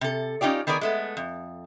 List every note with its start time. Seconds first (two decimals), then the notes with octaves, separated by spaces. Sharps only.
0.01 C3 A4
0.41 C#4 D#4 F4 G4 D5
0.67 D#3 B3 G#4 A#4 D5
0.81 G#3 A3 B3
1.17 F2